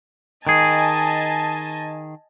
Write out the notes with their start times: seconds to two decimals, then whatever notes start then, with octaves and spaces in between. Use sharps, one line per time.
0.47 D#3 G#4 D#5 G#5 A5